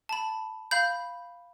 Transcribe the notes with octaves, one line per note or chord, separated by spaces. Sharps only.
A5 B5
F5 B5 G6